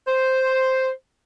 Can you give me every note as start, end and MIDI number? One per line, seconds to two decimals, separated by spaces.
0.07 0.90 72